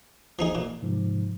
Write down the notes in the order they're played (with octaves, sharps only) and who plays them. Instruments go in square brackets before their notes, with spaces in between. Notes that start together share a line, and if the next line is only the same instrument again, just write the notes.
[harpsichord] F3 D#4 G#4
A#2
[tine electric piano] G#2 C3 F3